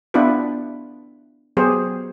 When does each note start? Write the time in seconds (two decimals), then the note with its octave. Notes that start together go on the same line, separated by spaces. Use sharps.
0.14 B3 D4 E4 F4 G4 B4
1.57 F#3 B3 G4 G#4 C5